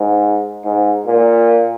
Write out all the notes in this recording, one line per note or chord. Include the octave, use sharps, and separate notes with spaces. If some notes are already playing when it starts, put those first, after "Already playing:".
Already playing: G#2
G#2
A#2